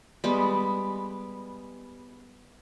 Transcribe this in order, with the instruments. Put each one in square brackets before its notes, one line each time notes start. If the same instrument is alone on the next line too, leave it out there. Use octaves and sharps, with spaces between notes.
[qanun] G3 G#3 B3